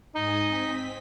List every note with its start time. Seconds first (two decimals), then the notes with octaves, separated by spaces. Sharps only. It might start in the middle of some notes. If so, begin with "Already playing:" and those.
0.15 G#2 D#4 G#5 D#6
0.48 C4 B6